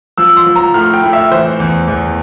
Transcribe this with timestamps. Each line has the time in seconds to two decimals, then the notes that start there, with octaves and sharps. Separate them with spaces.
0.18 F3 E6
0.37 C6
0.46 F3
0.56 A#5
0.74 A2 F6
0.94 G5
1.03 A2
1.13 E5
1.32 E3 C5
1.60 E2
1.88 E2